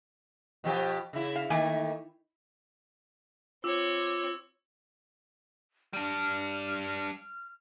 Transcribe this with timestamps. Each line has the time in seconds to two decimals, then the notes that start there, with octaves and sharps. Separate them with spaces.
0.64 B2 F3 G4
1.13 C#3 E4
1.36 F5
1.50 D#3 A3 A#3 G#5
3.64 C4 F4 C#5 D6 E6
5.93 G3 D4 F6